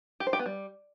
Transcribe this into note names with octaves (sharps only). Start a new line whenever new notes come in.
G4
C5
G4
B3
G3